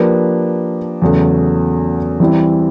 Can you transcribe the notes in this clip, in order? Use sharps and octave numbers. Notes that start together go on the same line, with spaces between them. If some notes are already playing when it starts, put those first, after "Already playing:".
Already playing: F3 A#3 D4 G4 B4
E2 C#3 F#3 A3
E3 G3 C4 E4